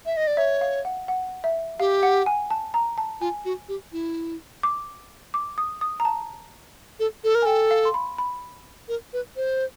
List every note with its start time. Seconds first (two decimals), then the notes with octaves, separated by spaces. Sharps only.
0.06 E5
0.17 D#5
0.27 D5
0.37 C#5 E5
0.61 F5
0.85 F#5
1.08 F#5
1.44 E5
1.80 G4 F5
2.03 F#5
2.26 G#5
2.50 A5
2.74 A#5
2.98 A5
3.21 F4 G#5
3.45 F#4
3.68 G4
3.93 E4
4.63 D6
5.34 D6
5.58 D#6
5.81 D#6
6.00 A#5
6.05 A5
6.99 A4
7.24 A4
7.35 A#4
7.42 G#5
7.45 A4 G5
7.71 F5
7.85 C6
7.94 B5
8.18 B5
8.88 A#4
9.13 B4
9.36 C5